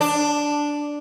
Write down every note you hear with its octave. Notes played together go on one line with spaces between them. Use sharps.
D4